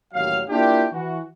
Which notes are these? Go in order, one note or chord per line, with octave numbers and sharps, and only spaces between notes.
A1 D#2 F#3 F5
A#3 D4 E4 F4 G4
E3 F#4